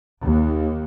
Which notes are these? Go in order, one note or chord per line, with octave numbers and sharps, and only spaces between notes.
D#2